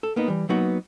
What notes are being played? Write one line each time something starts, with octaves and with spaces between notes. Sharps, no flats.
A4
A#3 B3 D#4
E3 G3
F#3 A#3 B3 D#4 F#4